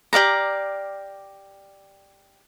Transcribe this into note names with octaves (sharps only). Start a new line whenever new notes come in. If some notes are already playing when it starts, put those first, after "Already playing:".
G4 D5 F5 A#5